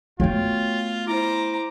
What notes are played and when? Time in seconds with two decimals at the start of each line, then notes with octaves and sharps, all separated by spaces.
0.20 A3 B3 F4 F#4 C#5 G5
1.07 E4 C5 A#5 D6